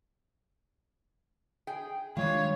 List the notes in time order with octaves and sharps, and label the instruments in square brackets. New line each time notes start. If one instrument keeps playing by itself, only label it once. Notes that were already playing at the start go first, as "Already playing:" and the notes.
[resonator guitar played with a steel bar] G#4 G5
[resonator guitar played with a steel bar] G2 F4 [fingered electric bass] D#3 G3 G#3 [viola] C#5